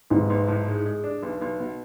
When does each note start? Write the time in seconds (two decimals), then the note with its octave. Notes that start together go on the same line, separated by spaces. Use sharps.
0.10 B1 G#2
0.30 B1
0.48 A2
0.67 G#3
0.85 G#3
1.04 D4
1.23 B1
1.41 B1
1.60 B2